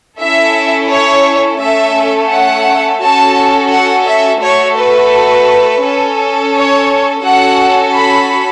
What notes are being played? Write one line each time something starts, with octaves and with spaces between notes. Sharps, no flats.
C#4 E4 A4 E5
C#5
A3 C#4 A4 E5
F#5
C#4 F#4 A4 A5
F#5
E5
A3 F#4 A4 C#5
B4
C#4 A4
C#5
C#4 F#4 A4 F#5
B5